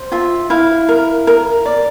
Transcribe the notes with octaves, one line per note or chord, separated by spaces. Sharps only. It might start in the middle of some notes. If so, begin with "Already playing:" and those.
Already playing: C5
F4 E5
E4 F5
A#4
A#4
D5